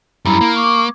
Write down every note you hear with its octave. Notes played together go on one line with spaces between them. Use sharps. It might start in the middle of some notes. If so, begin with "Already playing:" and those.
F#2 G3 E4 A#5 B5
A#3
C#6 D6